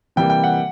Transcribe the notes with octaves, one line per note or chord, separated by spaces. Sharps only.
C3 E3 G3 A#3 G5
G5
F#5